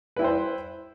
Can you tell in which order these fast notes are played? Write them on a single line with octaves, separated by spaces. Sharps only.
B4 E4 G5 C5